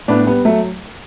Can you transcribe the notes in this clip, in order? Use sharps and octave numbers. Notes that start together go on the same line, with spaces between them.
A2 B3 D4
G3 B3
F#3 A3